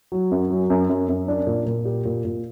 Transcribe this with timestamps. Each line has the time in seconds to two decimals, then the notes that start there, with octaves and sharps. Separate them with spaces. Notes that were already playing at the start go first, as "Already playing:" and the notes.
0.12 F#3
0.31 F#2
0.51 F#3
0.70 F#2
0.89 F#2
1.09 F#2
1.28 D4
1.47 A#2
1.66 A#2
1.85 G4
2.05 A#2
2.25 A#2